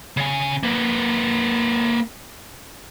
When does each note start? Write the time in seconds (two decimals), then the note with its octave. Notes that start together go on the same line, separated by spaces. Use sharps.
0.17 C#3 G#5
0.63 A#3 B4